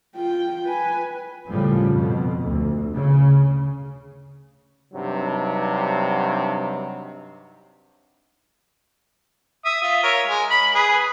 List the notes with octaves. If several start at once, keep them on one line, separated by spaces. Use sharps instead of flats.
F4 G5
B4 G#5
D#2 A2 C#3 F3 G3
F2 B2
D2
C#3
G2 C3 F#3 D#4
E5 D#6
F4 E5
A#4 C#5
G#3
B5
G#4 B4